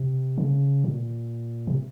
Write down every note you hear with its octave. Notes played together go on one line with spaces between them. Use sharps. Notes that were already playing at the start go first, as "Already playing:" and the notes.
Already playing: C3
C#3
A#2
C3